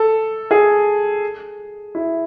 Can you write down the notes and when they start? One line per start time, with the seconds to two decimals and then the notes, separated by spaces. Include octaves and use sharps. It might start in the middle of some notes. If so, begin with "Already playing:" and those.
Already playing: A4
0.51 G#4
1.95 E4